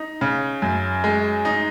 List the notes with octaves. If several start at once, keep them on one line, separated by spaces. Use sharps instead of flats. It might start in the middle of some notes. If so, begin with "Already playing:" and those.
Already playing: D#4
C#3
F#2
G#3
D#4